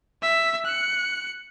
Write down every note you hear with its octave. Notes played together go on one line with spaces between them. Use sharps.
E5 B6
F#6 C#7